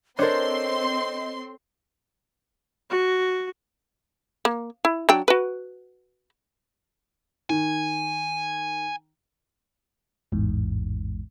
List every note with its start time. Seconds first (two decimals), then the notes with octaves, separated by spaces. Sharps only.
0.19 C4 D4 A4 A#4 C5 C#5 D#5 C6
2.90 F#4
4.45 A#3
4.85 E4
5.09 F#3 D4 G5
5.28 F#4 B4
7.50 D#3 G#5
10.32 A1 E2 G#2